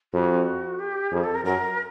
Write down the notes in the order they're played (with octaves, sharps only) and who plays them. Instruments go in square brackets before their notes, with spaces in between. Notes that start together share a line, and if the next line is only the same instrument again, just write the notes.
[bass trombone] F2 [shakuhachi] F#4
[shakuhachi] G4
[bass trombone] F2 [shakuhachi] G#4
[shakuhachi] A4
A#4
[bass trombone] F#2 [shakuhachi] A#4